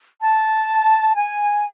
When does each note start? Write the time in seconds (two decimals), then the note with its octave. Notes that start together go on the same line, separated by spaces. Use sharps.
0.22 A5
1.15 G#5